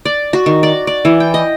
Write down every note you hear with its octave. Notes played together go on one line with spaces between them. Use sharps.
D5
F#4
D#3
D5
D5
E3
G5
D#5